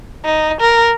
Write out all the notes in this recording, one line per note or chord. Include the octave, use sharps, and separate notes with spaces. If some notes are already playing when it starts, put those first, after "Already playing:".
D#4
A#4